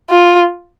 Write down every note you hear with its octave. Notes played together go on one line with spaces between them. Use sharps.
F4